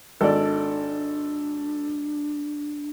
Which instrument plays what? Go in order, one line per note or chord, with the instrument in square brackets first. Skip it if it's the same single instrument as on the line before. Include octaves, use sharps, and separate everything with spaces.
[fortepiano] G#1 D5 [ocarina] D4 [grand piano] A4